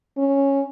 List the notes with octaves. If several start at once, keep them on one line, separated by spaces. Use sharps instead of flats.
C#4